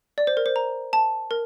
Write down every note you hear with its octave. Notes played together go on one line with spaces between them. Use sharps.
D5
C5
A#4
C5
A#5
A5
A#4